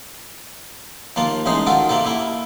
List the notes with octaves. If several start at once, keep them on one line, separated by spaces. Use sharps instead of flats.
D#2 A#3 F4 A5
A1 C3 G#3 D#4 C5
D#3 F4 F#4 A4
C3 A#3 C4 A4
A#3 E4